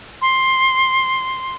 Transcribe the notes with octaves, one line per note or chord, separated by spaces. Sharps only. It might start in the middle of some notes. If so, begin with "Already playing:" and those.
C6